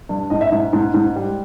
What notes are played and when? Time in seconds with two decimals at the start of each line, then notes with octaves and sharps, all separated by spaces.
0.09 G2
0.30 G#2 D#5
0.41 E5
0.52 G#2
0.73 G#2
0.94 G#2
1.16 G3